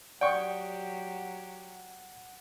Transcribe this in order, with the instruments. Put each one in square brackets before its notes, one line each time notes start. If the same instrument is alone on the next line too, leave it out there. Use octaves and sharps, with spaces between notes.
[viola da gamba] F#3 G4 [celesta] D5 D#6 [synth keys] F#5 [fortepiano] G5 C#6